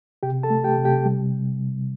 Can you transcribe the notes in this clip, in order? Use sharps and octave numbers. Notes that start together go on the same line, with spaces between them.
C3 G4 G5
A4 A5
A3
G4 G5
C3
G4 G5
G3